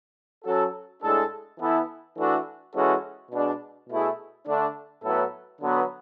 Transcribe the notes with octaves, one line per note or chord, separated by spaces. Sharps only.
F#3 C#4 F#4 A4
A2 G#3 D4 A4
E3 B3 E4 A4
E3 A3 D4 F#4 A4
E3 G#3 C#4 F#4 A4
B2 G#3 D4
B2 A3 E4 G#4
D3 A3 D4
A2 F#3 B3 E4 A4
D3 F#3 B3 F#4